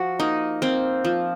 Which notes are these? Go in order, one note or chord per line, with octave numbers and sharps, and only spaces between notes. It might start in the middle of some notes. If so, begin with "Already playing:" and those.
Already playing: F3 F#4
A#3 D#4
A#3 C4
F3